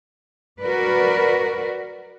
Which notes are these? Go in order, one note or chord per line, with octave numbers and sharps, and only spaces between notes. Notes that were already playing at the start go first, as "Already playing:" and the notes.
F#4 A#4 B4 D5